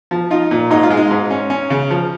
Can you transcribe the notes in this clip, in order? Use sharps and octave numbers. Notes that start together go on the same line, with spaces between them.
F3
D#4 F4
A#2
G#2 D#4
F4
G#3
D#4
G#2 D#4
C#4
C#4
C#3
F3